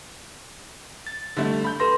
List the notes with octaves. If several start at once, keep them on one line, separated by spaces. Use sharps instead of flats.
A6
D3 G3 A3
B5 G6
A4 B4 C6 A#6